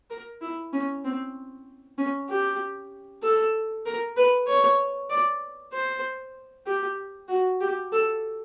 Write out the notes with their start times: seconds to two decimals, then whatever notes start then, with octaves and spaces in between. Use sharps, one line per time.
0.10 A#4
0.41 E4
0.73 C#4
1.04 C4
1.98 C#4
2.29 G4
3.23 A4
3.86 A#4
4.17 B4
4.48 C#5
5.10 D5
5.73 C5
6.66 G4
7.29 F#4
7.61 G4
7.92 A4